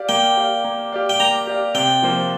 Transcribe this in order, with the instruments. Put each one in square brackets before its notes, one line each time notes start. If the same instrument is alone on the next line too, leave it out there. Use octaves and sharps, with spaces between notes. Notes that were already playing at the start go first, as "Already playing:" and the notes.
Already playing: [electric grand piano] G4 D5 F5
[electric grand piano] A#3 [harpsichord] G5
[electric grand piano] G4 D5 F5
A#3
G4 D5 F5
[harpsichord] G5
[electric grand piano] A#3 [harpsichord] A#5
[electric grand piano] G4 D5 F5
[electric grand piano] C3 [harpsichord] G5
[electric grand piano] F3 A#3 F4 C5